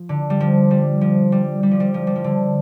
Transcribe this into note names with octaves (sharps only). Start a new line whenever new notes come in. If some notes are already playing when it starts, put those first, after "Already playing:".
Already playing: F3
D3
G3
F3
G3
F3
G3
G3
F3
G3
F3
G3
F3
D3